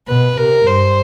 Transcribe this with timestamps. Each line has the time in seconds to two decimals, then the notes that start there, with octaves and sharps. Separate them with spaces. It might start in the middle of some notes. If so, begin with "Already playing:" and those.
0.08 B2 B4
0.37 C3 A#4
0.66 G2 C5